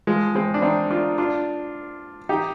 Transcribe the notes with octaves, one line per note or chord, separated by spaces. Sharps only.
F3 G#3
G#3 C4
D4
C4 D#4
D4 F4
D4 F4
D#4 G4